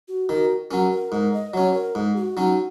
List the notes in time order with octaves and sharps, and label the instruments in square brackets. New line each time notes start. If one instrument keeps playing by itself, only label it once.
[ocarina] F#4
[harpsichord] D#3 [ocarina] F#4
[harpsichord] F#3 C#4 [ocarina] A#4
[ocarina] A#4
[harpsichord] G#2 [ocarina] A#4
[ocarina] D#5
[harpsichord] F#3 C#4 [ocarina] C#5
[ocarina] A#4
[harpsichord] G#2 [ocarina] G#4
[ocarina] F#4
[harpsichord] F#3 C#4 [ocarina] D#4